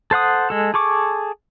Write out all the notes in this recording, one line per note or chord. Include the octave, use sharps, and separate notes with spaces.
A4 C5 F#5 D#6
G#3 A4
G#4 A4 C#6 D6